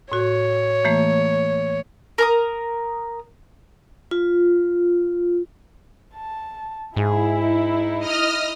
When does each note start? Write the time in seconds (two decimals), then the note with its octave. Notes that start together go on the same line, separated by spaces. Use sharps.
0.12 A2 F#4 C#5
0.85 E3 A3 A#3
2.18 A#4 A#5 D#6
4.11 F4
6.15 A5
6.97 G#2 E4 G#4
7.48 D#4
7.99 D#5 D#6 F6